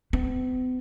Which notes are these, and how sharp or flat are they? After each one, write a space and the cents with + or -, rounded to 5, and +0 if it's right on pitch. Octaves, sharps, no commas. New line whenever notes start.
B3 +45